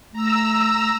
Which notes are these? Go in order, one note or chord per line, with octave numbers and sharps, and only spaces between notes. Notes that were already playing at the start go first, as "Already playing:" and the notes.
A3 A#5 E6